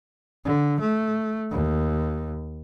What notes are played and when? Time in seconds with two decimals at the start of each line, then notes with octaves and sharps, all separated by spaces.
0.45 D3
0.80 A3
1.51 D#2